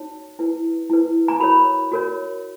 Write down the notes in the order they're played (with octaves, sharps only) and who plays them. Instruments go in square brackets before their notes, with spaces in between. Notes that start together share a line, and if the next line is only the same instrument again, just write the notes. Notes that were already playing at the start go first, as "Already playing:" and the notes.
Already playing: [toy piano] D#4 F#4 C#5
E4 B4
E4 B4
A#5
F#4 A#4 C#5 B5
F#4 A#4 C#5